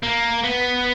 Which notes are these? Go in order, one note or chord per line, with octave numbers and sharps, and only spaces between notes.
A#3
B3